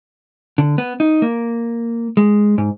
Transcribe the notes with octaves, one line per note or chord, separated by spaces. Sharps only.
D3
B3
D#4
A#3
G#3
G#2